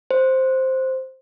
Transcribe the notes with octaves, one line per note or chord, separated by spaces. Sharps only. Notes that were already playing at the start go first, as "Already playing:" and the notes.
C5